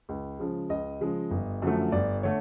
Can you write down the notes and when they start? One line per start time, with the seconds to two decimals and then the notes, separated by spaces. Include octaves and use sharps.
0.09 C#2
0.39 C#3 F3 G#3
0.69 C#2 D#5
1.01 C#3 F3 G#3
1.31 G1
1.62 F#2 D3 F3 A3
1.92 G1 D5
2.23 D3 A3 C#5